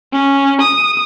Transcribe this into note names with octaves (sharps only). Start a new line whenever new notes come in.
C#4
D#6